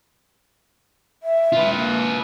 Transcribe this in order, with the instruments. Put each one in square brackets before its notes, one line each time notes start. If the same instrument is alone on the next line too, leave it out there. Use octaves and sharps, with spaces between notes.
[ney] E5
[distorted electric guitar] F4 B4
[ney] A#3